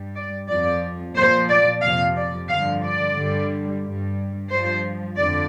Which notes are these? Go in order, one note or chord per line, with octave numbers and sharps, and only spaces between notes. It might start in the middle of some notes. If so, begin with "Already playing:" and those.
Already playing: G2 G3
D5
F2 F3 D5
A#2 F3 C5
D5
F2 C3 F3 F5
D5
G2 D3 F3 F5
D5
G2 D3 G3
G2 G3
G2 F3 C5
F2 D3 D5